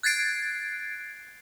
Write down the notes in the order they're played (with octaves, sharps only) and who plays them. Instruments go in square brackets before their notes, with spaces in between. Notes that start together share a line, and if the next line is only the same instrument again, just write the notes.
[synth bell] F#6 G#6 A6 C7 D7